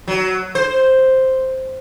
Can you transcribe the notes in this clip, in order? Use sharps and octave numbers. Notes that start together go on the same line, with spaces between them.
F#3
C5